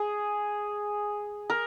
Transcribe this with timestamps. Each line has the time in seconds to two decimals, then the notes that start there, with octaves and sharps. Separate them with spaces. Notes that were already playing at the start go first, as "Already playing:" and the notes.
Already playing: G#4
1.50 A#4